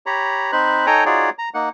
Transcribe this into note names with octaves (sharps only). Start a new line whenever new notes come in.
G4 C#5 A#5 B5
C4 D#4 C5 B5 F#6
D#4 A4 C#5 G5 G#5 A#5
D#4 F4 F#4 G#4 C#5 D5
A#5
A#3 D#4 F#5